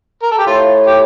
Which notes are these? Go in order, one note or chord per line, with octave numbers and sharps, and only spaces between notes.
A#4
A4
G4
A2 F4
G4